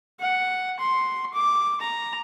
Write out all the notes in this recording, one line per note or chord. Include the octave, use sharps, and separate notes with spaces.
F#5
C6
D6
A#5